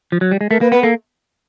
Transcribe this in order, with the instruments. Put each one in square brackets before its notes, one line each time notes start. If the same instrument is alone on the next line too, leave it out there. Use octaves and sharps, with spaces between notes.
[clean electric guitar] F3
F#3
G3
G#3
[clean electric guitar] A3 [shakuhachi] A#4
[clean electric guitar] A#3 [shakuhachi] B4
[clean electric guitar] B3 [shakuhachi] B4
[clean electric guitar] A#3 [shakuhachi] A4